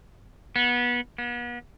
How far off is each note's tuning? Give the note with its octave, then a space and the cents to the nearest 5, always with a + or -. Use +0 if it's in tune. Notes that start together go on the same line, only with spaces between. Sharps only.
B3 -25
B3 -40